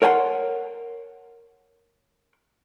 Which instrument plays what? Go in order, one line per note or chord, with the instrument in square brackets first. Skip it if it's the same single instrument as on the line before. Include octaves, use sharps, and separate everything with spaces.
[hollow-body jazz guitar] A#4 C#5 F#5 G#5 C6